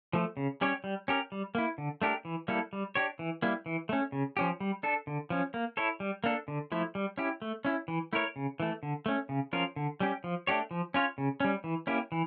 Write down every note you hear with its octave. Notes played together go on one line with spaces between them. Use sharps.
F3 A3
C#3
G3 C#4 G4 C#5
G3
C#4 G4 A#4
G3
A#3 E4
D3
A3 D4 G4 A#4
E3
G3 A#3 E4 A4
G3
D4 G4 C#5
E3
G3 A#3 E4
E3
A3 C#4
C#3
F3 C#4 G4
G3
D4 A4
D3
F3 C#4
A#3
E4 A4 C#5
G3
A#3 D4 A4
D3
F3 A3 E4
G3
C#4 E4 G4
A3
C#4 E4
E3
A3 E4 A#4 C#5
C#3
E3 A3
D3
A3 C#4
C#3
F3 C#4 F4 A#4
D3
G3 C#4 G4
F3
A3 D4 G4 C#5
F3
C#4 F4 C#5
C#3
G3 C#4
E3
A#3 C#4 E4 G4
E3